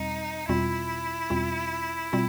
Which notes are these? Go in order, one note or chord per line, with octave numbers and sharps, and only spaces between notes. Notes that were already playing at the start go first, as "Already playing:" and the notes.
Already playing: E2 B2 G3 C4 D#4
E2 B2 G3 C4 E4 F4
E2 B2 G3 C4 F4
B2 G3 C4 F4